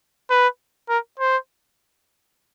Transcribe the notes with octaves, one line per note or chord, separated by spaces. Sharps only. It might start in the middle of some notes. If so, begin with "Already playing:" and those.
B4
A#4
C5